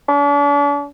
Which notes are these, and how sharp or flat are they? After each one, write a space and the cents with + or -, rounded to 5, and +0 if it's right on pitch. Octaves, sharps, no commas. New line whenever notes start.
D4 -45